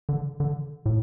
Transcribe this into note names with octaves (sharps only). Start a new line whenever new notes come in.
D3
D3
A2